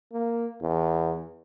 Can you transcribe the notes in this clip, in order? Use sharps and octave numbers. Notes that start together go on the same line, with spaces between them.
A#3
E2